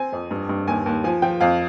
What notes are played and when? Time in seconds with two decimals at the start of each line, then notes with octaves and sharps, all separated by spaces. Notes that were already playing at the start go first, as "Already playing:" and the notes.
Already playing: C4 G#5
0.12 F2
0.31 G2
0.49 G2
0.67 D#2 G#5
0.86 D#2
1.04 F3 G#5
1.22 F3 G5
1.40 F2 F5